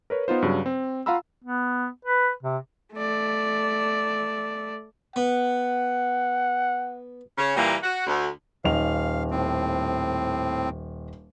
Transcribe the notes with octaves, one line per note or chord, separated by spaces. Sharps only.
A#4 B4 C#5
B3 D#4 F4 C5
G2 C#3 F#3
C4
F4 F5 F#5 A#5 B5 E6
B3
B4
C3
A3 D5
B3 F#5
C#3 C#4
A#2 E3 G3 A#3
F#4
D2
D#1 D#5 F5 F7
A2 C4